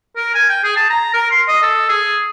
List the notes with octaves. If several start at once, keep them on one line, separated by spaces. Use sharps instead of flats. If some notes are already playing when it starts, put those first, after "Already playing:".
A#4
G#5
G5
G#4
A5
A#5
A#4
C6
D#5
A4
G#4